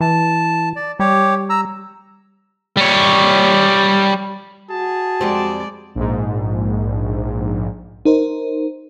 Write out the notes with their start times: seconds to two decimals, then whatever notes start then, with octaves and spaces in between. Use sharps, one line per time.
0.01 E3 A5
0.76 D5
0.99 G3 G4 C#5
1.50 A#5 E6
2.77 G3 C#5
4.70 F#4 G#4 A5
5.21 F2 G3 G#3 C4 D5
5.95 A#1 G#2
8.05 D#4 A#4 C5